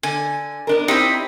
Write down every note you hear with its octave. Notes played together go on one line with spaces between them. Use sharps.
D3 G#5
B3 D4 A#4
C4 D#4 E4 G4 B5